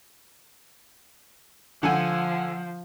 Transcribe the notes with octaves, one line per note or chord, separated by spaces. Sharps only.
D3 F3 F#5 G#5